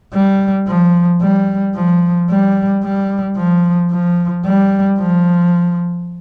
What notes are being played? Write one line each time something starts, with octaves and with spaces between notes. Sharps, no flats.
G3
F3
G3
F3
G3
G3
F3
F3
G3
F3